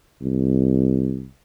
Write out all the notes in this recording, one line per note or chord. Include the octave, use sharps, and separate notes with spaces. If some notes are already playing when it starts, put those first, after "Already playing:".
C2